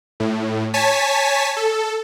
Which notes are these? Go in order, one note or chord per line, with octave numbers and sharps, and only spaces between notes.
A2
C#5 G#5 A5 B6
A4